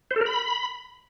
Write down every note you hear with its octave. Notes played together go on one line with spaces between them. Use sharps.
C5
A4
A#4
B5